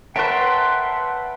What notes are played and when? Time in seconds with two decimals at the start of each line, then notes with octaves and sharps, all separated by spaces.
0.16 A#4 B4 C#5 E5 F#5 G5 A5 C6